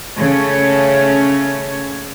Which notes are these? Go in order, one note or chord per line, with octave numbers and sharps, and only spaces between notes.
C#3 A3 C#4 C#5